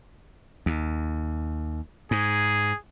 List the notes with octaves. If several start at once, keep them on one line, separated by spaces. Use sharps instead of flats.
D#2
G#2 G#4